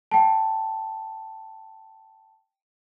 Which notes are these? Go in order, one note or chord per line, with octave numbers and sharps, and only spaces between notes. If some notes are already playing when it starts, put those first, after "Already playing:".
G5 A5